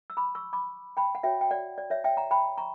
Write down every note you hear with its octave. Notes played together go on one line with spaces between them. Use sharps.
E6
B5 D6
C#6 E6
B5 D6
G5 B5
F#5
F#4 C#5 E5 G5
G5
D5 F#5
D5
C#5 E5
E5 G5
F#5 A#5
G5 B5
A#5 C#6